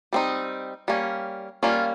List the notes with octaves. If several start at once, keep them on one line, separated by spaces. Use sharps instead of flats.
G3 C4 D#4
G3 A#3 C#4
G3 A#3 C#4 F4